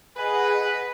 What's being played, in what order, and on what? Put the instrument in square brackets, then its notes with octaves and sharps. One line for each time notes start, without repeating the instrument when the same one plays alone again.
[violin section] G#4 D#5 F#5 [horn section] B4